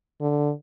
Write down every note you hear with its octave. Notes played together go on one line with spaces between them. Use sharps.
D3